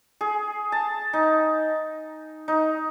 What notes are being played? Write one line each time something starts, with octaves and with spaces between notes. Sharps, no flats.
G#4
A5
D#4
D#4